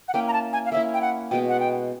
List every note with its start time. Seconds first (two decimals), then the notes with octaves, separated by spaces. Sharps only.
0.08 F#5
0.14 A#3 C#4 E4 G5
0.28 A#5
0.33 A5
0.53 G#5
0.66 F5
0.72 A#3 C#4 E4 E5
0.94 G5
1.01 F#5
1.31 B2 G#3 B3 G5
1.49 F#5
1.60 G5